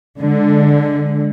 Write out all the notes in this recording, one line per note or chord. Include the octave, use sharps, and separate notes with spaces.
D3 G#3